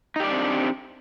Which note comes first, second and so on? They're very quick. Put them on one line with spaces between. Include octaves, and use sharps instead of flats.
D#4 G4 D5 D4 C4